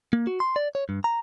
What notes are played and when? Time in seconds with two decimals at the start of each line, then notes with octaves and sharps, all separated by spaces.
0.13 A#3
0.27 F#4
0.40 C6
0.56 D5
0.75 C#5
0.89 G2
1.04 A#5